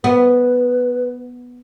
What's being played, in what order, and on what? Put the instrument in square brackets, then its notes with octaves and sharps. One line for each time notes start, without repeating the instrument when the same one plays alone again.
[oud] B3 [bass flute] B4